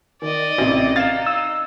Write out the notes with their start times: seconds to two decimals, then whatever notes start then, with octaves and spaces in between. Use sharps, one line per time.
0.22 D#3 D5 D#5
0.58 A1 C3
0.96 D#4 F5 G#6 A6 E7
1.26 E6